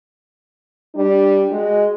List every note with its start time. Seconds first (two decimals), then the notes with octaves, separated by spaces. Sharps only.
0.95 G3 D4
1.49 G#3 F#4